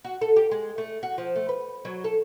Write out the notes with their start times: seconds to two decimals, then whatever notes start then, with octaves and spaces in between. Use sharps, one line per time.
0.05 F#4
0.21 A4
0.36 G4
0.51 G#3
0.78 A3
1.03 F#4
1.18 F3
1.36 A3
1.49 B4
1.85 F#3
2.04 A4